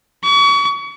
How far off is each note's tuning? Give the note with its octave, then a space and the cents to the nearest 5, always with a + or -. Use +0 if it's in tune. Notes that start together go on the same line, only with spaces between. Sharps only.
C#6 +35